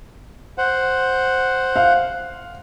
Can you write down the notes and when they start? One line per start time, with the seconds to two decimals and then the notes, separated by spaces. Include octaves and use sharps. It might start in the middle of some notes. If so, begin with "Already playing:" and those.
0.58 C5 F#5
1.76 F5